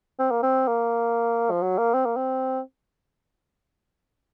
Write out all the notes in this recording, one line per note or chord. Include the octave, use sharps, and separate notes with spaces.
C4
A#3
C4
A#3
F3
F#3
A#3
C4
A#3
C4